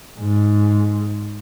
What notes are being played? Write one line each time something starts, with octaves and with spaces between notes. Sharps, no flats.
G#2